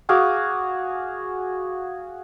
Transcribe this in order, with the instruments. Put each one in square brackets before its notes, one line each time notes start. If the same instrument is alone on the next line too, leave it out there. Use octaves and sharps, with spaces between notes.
[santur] F#4 G#4 F5 D6